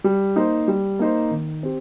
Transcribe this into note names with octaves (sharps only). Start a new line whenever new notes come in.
G3
A#3 D#4 C5
G3
A#3 D#4 C5
D#3
C4 G4